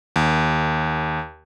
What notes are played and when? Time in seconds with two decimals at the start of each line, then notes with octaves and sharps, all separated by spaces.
0.16 D#2